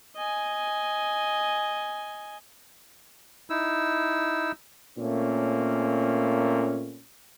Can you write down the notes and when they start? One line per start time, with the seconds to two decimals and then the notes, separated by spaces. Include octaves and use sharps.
0.16 D#5 G#5
3.50 D#4 E4 E6
4.98 A#2 A3 A#3 C4 C#4